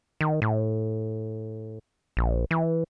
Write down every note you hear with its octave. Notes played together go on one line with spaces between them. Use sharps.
D#3
A2
A#1
E3